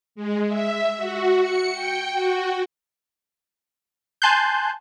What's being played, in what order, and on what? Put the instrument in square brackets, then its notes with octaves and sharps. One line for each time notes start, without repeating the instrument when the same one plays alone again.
[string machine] G#3
E5
F#4
C#7
G5
F#4
[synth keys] G#5 A5 C6 F#6 G6